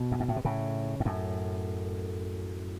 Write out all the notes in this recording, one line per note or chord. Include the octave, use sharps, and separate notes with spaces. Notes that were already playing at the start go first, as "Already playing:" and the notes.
Already playing: B2
F#2
G#2
A2
B2
A2 C#3
G#2
F#2 A2